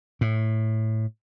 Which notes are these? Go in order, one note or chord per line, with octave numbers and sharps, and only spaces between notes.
A2